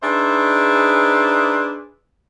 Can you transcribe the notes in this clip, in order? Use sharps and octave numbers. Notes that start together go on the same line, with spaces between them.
D4 D#4 G#4 B4 C5 E5